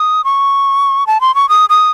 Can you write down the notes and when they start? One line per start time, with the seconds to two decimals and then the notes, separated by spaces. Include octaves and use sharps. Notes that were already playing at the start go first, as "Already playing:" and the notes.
Already playing: D#6
0.24 C#6
1.07 A5
1.21 C6
1.35 C#6
1.49 D#6
1.69 D#6